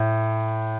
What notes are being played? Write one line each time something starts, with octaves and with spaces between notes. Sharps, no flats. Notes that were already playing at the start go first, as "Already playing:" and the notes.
Already playing: A2